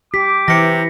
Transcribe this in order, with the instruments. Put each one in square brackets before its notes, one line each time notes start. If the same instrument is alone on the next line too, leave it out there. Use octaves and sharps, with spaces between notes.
[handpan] G4 [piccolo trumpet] D6 [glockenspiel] B6
[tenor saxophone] C3 [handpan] E3 [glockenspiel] A#6 C#7